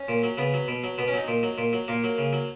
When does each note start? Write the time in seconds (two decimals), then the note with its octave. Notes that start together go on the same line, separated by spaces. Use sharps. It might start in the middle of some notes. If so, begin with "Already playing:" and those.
Already playing: C#4
0.08 A#2
0.23 F#3
0.38 C#3 B3
0.54 F#3
0.68 B2
0.83 F#3
0.98 B2 B3
1.08 C#4
1.14 F#3 D#4
1.28 A#2
1.43 F#3
1.58 A#2
1.73 F#3
1.88 A#2 A#3
2.04 F#3
2.18 C#3
2.33 F#3